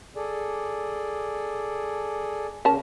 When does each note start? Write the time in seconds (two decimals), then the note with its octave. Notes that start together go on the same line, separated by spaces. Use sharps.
0.16 G#4 A4 D5
2.65 C#3 C#4 A#4 A5